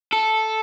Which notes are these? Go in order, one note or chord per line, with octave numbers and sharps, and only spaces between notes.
A4